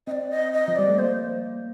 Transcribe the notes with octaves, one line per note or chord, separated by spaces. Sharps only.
C4 D5 D#5
D#5
D#5
F3
G3 D5
A3
A#3 C5